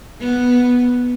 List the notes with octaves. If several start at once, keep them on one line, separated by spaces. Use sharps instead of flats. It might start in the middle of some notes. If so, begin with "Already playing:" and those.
B3